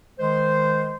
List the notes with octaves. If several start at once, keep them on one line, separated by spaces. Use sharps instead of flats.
D#3 G#3 C5